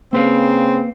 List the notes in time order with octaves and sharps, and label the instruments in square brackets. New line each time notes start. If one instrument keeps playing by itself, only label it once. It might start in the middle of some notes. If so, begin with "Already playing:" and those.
[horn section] C#3 C4 [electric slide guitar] A#3 B4 F5